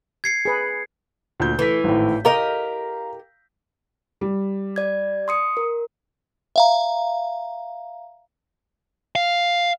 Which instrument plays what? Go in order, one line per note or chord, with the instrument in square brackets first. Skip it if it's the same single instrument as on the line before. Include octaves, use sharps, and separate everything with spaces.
[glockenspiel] G#6 C7 C#7
[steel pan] G#4 B4 B5
[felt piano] D2 A#2 G6
[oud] E3 [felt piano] A3 B6
[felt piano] G#1 A2
[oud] G4 A#4 D#5 [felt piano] F5 A#5
[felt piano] G3
[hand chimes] D5 G#6
C6 D#6 C#7
A#4
[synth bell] E5 F5 A#5
[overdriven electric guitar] F5